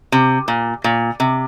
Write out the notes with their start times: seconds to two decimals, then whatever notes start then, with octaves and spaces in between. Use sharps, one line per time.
0.12 C3
0.48 A#2
0.84 A#2
1.20 C3